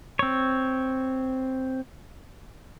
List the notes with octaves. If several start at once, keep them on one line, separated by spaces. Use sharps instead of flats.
C4 C#5